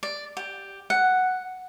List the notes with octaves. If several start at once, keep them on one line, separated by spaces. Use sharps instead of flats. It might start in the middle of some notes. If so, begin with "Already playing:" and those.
D5
G4
F#5